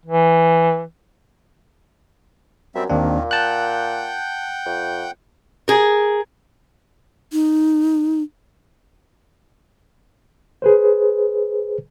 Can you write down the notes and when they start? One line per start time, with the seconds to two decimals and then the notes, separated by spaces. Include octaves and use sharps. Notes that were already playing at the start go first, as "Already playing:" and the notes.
0.05 E3
2.75 F#2 G3 C4 E5
2.90 D#2 A#2 D#3 C4 D4
3.31 F#5 G5 A5 F#6 G6
4.66 F2
5.68 G#4 A#4
7.33 D#4
10.62 G#4 B4 C5